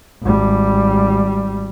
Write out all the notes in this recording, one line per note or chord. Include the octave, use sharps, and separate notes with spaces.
G#1 G3